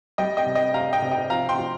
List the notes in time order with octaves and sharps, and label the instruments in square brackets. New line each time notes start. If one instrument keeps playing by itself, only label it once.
[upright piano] G3 D#5 G5
D#5 G5
C3
D#5 G5
C3 F5 A#5
D#5 G5
C3
D#5 G5
F3 F5 A#5
G5 C6
F3